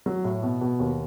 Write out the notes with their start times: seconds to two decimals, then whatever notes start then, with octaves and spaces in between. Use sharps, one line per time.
0.06 F#3
0.24 A2
0.43 B2
0.61 B2
0.80 D#2